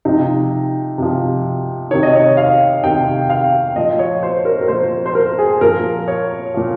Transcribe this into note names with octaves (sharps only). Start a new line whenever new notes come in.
C3 F3 D#4
C3 F3
C3 D#3 C#5
D#5
C#5
F5
C3 D#3 G5
F5
A#2 F3 D#5
C#5
C5
A#4
A#4
A#2 F3 C5
C5
A#4
G#4
A#2 F3 A#4
C#5
A#2 F3